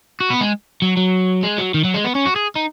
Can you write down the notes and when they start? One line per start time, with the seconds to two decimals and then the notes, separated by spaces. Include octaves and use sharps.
0.20 F#4
0.30 B3
0.41 G#3
0.82 F#3
0.97 F#3
1.44 G#3
1.58 F#3
1.74 D#3
1.84 F#3
1.94 G#3
2.04 B3
2.15 C#4
2.25 F#4
2.36 G#4
2.56 D#4